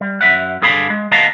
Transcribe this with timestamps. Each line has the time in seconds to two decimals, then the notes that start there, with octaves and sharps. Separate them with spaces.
0.01 G3
0.21 F#2 F3 E5 F#5
0.62 G2 D3 G#4 F5 B5
0.90 G#3
1.11 D#2 B3 D#5 F5 A5 A#5